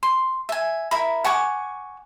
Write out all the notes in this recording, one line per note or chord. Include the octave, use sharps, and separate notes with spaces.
C6
E5 G#5
E4 A#4 B5
F#5 G#5 C#6 D6